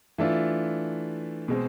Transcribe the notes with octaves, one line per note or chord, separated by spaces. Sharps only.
E3 A3 D4 F4
B2 G#3 C4